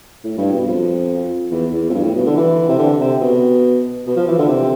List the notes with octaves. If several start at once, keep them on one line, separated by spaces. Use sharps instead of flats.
A2
G2
B2
F2
E2
E2
F2
G2
A2
B2
D3
E3
C3
D3
C3
B2
B2
F3
E3
D3
C3